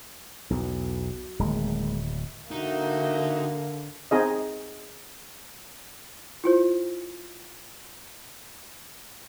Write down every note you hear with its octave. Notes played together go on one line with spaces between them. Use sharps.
B1 E2 F#4
D1 D#3 G#3 A#3
D3 A#3 D#4 F#4 E5
C4 D#4 G#4 D#5
E4 F4 C5